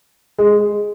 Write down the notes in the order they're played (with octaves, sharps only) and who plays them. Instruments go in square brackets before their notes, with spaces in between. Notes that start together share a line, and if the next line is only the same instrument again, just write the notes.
[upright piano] G#3